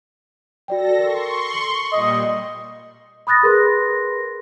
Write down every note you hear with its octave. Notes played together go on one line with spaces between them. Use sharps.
F#4 A4 D5 G5 A#6
A#4 C6 C#6
F#7 G7
A#2 G3 D#5
B5 D#6 F#6 A6 A#6
G#4 A#4 B4 C6 A#6